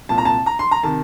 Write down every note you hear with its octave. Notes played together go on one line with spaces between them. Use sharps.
C2 A#2 A5
A#5
A5
A#5
C6
A#5
C3 D#3 A5